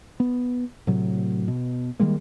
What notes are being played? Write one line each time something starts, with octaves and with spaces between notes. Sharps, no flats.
B3
A2 C3 F#3
B2
D#3 G3 G#3 A#3